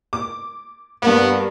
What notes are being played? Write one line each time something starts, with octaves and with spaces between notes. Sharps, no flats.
D6
G2 A#3 B3